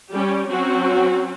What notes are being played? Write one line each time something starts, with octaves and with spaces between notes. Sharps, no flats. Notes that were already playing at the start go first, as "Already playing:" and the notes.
G3 C#4 G4
F#3 C4 C#4 F#4